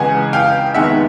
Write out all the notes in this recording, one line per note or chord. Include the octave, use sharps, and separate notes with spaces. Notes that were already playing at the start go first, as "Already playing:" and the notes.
Already playing: C#2 C#3 E3 G#3 F#5 G#5
F5 G5
F1 D#2 D#3 G#3 B3 E5 F#5